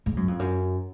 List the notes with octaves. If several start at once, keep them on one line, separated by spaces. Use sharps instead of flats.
G#2
F#2
F2
F#2